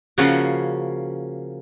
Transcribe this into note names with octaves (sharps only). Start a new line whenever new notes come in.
C#3 F3 A#3 C#4 F#4